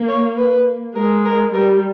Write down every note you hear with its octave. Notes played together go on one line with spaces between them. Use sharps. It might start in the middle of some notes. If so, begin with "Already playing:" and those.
Already playing: A#3
C#5
B4
G#3 A#4
A#4
G3 A#4